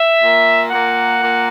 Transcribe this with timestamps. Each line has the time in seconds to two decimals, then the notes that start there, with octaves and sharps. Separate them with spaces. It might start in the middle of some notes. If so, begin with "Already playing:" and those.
Already playing: E5
0.23 A#2 A#3
0.70 A#2 A#3 F#5
1.20 A#2 A#3